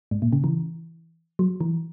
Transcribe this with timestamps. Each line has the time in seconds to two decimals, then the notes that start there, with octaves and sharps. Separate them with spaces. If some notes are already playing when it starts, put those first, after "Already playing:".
0.11 G#2
0.22 A#2
0.33 C#3
0.44 E3
1.39 F#3
1.61 E3